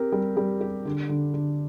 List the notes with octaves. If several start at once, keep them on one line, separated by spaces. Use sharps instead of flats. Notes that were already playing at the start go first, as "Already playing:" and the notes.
Already playing: C4 G4 A#4
G3
G3
G4
D3
D3
D3